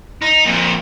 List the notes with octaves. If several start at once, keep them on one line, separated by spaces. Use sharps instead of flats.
D#4
F2 A#2